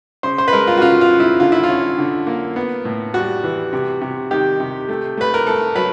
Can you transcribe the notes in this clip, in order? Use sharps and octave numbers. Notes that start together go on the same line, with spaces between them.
C#3 C5
C5
B4
G#3 A#4
F4
F#4
C#3 F4
F4
C#3
E4
D3 F4
E4
F4
C#4
D3
A#3
B3
A2
G3 F#4
E3
C3
C3
D#3 G4
C3
A3
A3 B4
A#4
A3 A4
F#3 B4